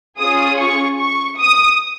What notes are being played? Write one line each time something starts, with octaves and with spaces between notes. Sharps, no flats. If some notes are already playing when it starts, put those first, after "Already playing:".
C#4 F4 G#4 D#6
C#6
C#6
D#6